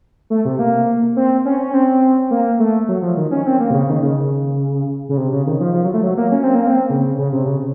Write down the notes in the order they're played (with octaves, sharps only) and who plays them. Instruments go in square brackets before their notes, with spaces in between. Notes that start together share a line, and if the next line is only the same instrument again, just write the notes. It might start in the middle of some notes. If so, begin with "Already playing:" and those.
[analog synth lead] A3
C3
A#3
C4
C#4
C#4
C4
A#3
A3
F#3
F3
D#3
C#4
C4
A#3
C3
C#3
D#3
C#3
C#3
C3
C#3
D#3
F3
F3
F#3
A3
F#3
A#3
C#4
C4
A#3
C4
C#3
C#3
C3
C#3